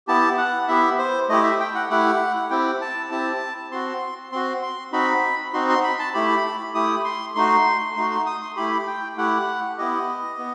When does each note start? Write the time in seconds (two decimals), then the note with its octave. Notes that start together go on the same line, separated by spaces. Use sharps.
0.07 B3 E4 G4 A5
0.38 F#5
0.68 B3 E4 G4 E5
0.98 C5
1.29 A3 E4 G4 D#5
1.44 E5
1.60 G5
1.75 F#5
1.90 A3 E4 G4 F#5
2.50 C4 E4 G4 G5
2.81 A5
3.11 C4 E4 G4 A5
3.71 C4 F#4 C6
4.32 C4 F#4 C6
4.63 C6
4.92 C4 D#4 F#4 B5
5.53 C4 D#4 F#4 C6
5.69 C6
5.84 B5
5.99 A5
6.14 A3 E4 G4 B5
6.74 A3 E4 G4 D#6
7.04 C6
7.35 A3 D#4 F#4 C6
7.96 A3 D#4 F#4 C6
8.11 C6
8.26 D#6
8.41 C6
8.56 A3 E4 G4 B5
8.87 G5
9.17 A3 E4 G4 F#5
9.78 B3 E4 G4 D#5
10.38 B3